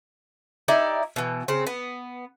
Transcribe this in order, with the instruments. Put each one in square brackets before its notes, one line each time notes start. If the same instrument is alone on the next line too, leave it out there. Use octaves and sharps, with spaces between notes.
[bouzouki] D#4 E4 G4 D5
B2 E3
C#3 C4
B3